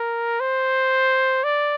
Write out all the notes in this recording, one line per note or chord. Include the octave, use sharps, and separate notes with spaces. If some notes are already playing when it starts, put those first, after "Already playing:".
Already playing: A#4
C5
D5